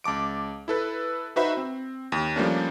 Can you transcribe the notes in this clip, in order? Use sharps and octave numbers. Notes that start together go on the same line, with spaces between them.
C#2 A5 D6 D7
E4 A4 B4
D#4 F#4 B4 C5 E5 B5
C4
D#2
F3 G3 A3 A#3 C#4 D4